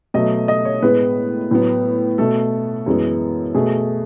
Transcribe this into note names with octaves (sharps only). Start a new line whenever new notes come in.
B2 F#3 A3 D#5
D#5
C#5
A2 G#3 B3 B4
A2 F#3 B3
B2 A3 A4
F#2 E3 G#3 B3
B2 A3 G#4